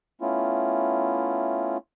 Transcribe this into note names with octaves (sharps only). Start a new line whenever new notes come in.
A3 B3 C#4 E4 F4